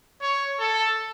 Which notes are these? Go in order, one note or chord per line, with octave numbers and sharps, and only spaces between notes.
C#5
A4